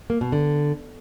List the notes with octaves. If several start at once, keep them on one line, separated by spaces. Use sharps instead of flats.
A#3
B2
D3